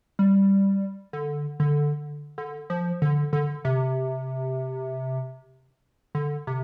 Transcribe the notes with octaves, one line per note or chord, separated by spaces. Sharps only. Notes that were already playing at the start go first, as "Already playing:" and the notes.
G3
D3
D3
D3
F3
D3
D3
C3
D3
C3